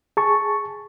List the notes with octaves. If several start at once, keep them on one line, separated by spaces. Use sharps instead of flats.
G#4 A5 C#6